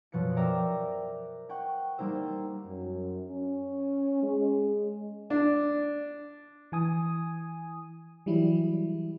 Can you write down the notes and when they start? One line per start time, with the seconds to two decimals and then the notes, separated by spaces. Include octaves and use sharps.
0.12 F#2 B2 F3 F#6 C#7
0.36 A#4 C5 D5 E5 G5 A#5
1.49 F#5 G5 C#6
1.98 G3 A#3 D#4 C5 E6
2.66 F#2
3.31 C#4
4.23 G#3
5.30 D4
6.72 E3 G#5 D#6
8.26 E3 F#3 G3 E4